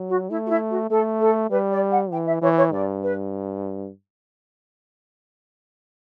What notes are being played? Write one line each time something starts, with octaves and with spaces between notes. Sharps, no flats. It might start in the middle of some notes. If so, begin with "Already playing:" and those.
Already playing: F#3
F#4
A3 E4
F#4
E4
F#4
A3 A4
A4
G3 B4
D5
F#5
E3 G5
E5
E3 C#5
C#5
G2 D5
B4